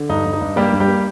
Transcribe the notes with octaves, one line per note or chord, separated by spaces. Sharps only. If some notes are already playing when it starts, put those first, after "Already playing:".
Already playing: D3
G2 D#4
G2
D#4
G2
G3 A#3 G4
G2
G3 G4
A#3